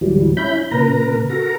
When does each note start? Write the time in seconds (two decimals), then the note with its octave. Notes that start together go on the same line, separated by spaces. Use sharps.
0.01 D2 G#2 E3 F#3 G3
0.37 C#4 E4 B5 G6
0.71 A#2 C#3 A#4 B4 A#5
1.30 F#4 A4 A#4 A#5